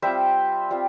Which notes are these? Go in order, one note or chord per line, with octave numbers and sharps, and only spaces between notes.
G3 C4 F4 C5 E5
G3 C4 F4